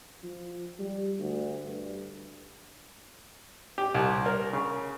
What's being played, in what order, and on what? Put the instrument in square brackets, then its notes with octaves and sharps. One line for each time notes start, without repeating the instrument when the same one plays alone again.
[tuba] F3
G3
D2
G2
[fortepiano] G4
C2
A#4
C#3